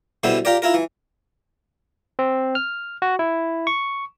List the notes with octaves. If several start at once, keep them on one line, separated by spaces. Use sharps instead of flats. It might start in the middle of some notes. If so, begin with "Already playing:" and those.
B2 D3 G3 E4 C5
F4 G4 A#4 D5
E4 F4 A#4
E3
C4
F6
F#4
E4
C#6